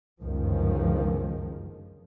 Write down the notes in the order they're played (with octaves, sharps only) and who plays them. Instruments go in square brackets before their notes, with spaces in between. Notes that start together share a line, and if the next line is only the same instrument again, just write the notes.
[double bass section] G1 C#2 F#2 D#3 F3